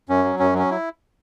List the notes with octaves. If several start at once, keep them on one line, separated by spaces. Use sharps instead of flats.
F#2 C#4
F#3
F#2 C#4
F#3 C#4
E4